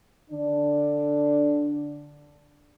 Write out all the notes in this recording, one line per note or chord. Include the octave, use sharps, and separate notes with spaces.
D3 D4